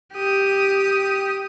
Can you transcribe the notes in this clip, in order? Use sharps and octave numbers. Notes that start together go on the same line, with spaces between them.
G4 D#6